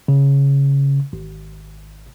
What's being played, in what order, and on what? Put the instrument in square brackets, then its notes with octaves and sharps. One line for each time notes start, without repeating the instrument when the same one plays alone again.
[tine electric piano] C#3
G#1